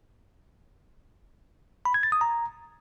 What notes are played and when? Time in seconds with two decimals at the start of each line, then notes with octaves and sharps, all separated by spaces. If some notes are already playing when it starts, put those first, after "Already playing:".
1.85 B5
1.94 G#6
2.03 A6
2.12 D#6
2.21 A#5